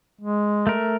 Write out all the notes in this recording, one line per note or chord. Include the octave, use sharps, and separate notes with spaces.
G#3
A3 A#4